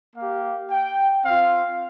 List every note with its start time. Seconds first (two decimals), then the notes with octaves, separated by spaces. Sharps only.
0.16 A#3 G4 F5
0.71 G5
1.25 C4 F4 F5